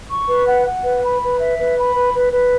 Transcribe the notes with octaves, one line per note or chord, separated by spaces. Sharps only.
C#6
B4
F#5
F#5
B4
B5
B4
E5
B4
B5
B4
B4
B4